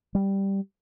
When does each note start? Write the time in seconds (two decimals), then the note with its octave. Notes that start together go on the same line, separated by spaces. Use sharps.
0.15 G3